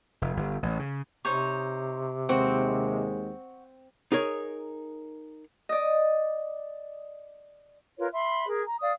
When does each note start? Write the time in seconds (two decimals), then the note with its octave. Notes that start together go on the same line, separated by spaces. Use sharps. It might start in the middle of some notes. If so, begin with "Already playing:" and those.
0.22 F1
0.37 G1
0.63 A1
0.79 C#3
1.25 C3 D#4 C5 C#5
2.29 D#2 G#3 C4 F#4
4.12 D#4 G#4 A#4 C#5
5.69 D5 D#5
7.99 F4 A#4 B4 C#5
8.14 E5 B5 C6
8.47 G#4 A#4
8.67 A#5
8.81 D5 F5 D#6